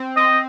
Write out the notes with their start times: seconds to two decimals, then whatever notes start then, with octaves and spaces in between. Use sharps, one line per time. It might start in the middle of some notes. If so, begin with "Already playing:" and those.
Already playing: C4
0.16 C4 D#5